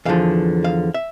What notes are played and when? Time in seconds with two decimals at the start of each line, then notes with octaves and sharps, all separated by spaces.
0.05 E2 D3 F3 F5
0.64 F5
0.94 E5